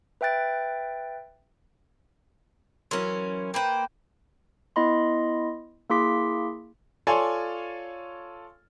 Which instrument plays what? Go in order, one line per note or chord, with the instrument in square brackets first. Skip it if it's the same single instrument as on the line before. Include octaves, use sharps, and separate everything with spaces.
[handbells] B4 E5 G5 F#6 A6 D7
[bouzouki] E3 C#4 [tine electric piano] F#3 A#4 C6
[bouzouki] A#3 B4 C5 [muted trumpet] G5
[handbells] B3 E4 D#5 B5 C6
A#3 E4 G#4 C6 D6 B6
[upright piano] F4 A4 C#5 D5 G#5 C6